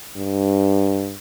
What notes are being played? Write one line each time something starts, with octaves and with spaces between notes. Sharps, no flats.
G2